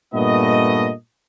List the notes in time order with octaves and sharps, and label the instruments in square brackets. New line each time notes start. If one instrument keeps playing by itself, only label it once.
[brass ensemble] G2 A#2 A3 B3 D#5